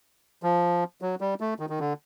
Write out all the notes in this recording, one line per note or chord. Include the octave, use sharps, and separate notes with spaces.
F3
F#3
G3
A3
D#3
D#3
D3